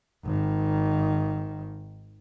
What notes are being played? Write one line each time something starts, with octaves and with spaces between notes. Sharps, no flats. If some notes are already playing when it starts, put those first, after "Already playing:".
G#1 D#3